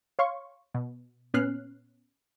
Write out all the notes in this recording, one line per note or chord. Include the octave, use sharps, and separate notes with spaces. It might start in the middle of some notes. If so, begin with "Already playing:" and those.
C#5 F5 C6 C#6
B2
A#2 B3 C#4 F6 F#6 C7